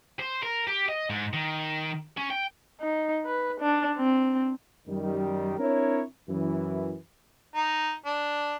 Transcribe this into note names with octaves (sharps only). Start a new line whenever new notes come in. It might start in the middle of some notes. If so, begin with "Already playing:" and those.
C5
A#4
G4
D#5
G#2
D#3
C#4
G5
D#4
B4
D4
C4
F#2 D#3 G3
C4 D4 E4 A#4 C#5
F#2 E3
D#4
D4